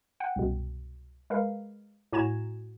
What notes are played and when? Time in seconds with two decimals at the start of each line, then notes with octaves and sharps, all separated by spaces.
0.20 F#5 G5
0.36 C2 F#2 B2
1.30 G#3 A#4 B4 F5
2.13 A2 F#4 G#5 A#5 G#6 E7